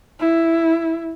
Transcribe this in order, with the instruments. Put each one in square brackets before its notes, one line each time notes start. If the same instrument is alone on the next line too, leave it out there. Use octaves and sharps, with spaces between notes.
[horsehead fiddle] E4